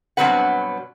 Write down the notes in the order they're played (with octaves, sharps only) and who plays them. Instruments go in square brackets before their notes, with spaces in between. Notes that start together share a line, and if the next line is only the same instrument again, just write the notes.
[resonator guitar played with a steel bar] G2 B2 F#3 C4 B4 F#5